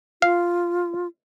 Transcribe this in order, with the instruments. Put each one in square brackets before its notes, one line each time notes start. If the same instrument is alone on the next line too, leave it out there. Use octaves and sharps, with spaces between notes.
[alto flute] F4 [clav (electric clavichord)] F5